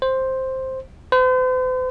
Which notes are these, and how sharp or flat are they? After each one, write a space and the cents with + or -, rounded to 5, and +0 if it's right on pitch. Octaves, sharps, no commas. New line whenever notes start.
C5 +5
C5 -45